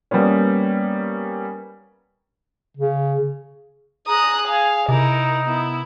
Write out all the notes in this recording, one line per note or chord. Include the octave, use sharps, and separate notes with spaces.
G3 A#3 B3 C#4
C#3
G#4 A#5 D#6 F#6
F5 G#5
C3 D#4 E4 A#4
B3 E4